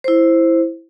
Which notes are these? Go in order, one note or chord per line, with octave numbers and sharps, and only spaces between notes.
E4 C5